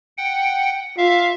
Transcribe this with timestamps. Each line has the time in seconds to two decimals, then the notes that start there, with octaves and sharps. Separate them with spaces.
0.18 F#5 G5
0.97 F4 E5 F5